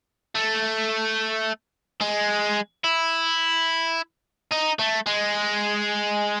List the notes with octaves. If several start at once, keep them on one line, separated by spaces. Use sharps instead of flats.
A3
G#3
E4
D#4
A3
G#3